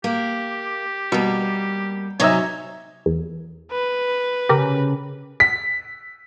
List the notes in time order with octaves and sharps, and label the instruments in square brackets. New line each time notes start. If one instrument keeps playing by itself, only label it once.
[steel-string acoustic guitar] A#3 [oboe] G4
[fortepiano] B2 [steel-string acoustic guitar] G3 A#3
[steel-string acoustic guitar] C3 F#3 D#4 [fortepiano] C#5 D#5 E5 [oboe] G#5
[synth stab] E2
[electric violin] B4
[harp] C#3 [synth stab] G4 A#4
[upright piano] B6